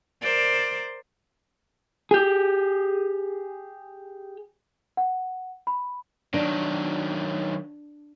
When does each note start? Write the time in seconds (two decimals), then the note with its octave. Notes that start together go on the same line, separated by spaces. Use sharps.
0.21 A#4 C5 D5
2.11 G4 G#4
4.97 F#5
5.67 B5
6.34 D#3 F#3 D4